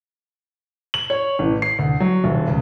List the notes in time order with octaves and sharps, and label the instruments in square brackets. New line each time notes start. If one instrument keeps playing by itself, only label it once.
[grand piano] F#7
C#5
A1
C7
D2
F#3
D#1
C#2